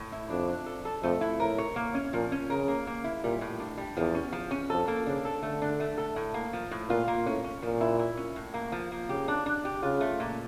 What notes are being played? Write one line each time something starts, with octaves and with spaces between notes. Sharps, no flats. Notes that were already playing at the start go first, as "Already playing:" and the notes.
Already playing: A2
E4
F2 D4
D4
A4
A4
F2 A3
E4
A2 A#4
C#5
A#3
C#4
A#2 F3
C#4
C#3 A#4
A#3
A#3
E4
A#2 G3
A2
D4
G3
E2 F3
C#4
F3
C#4
F2 A4
A#3
C#3 D4
A4
D3 A3
D4
A3
A4
A2
A#3
F3
A2
A#2 F4
A#3
A2 C#4
C#4
A#2 F3
E4
E4
C#4
A2
A#3
F3
A#3
C#3 G4
D4
D4
G4
C#3 F4
A3
A#2